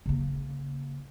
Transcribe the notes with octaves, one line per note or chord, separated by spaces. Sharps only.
C#3 A#3